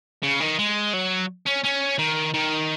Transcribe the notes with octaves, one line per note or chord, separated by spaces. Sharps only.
C#3
D#3
G#3
F#3
C#4
C#4
D#3
D#3